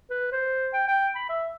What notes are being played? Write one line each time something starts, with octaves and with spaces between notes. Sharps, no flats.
B4
C5
G5
G5
B5
E5